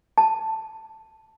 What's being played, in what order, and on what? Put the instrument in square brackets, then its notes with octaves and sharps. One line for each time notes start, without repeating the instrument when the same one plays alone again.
[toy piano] A5